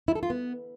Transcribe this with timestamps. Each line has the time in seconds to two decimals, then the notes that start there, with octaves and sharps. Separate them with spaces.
0.08 E4
0.15 A4
0.23 F4
0.30 B3